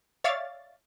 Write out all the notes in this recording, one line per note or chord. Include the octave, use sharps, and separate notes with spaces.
C#5 D5 E5 F5 A6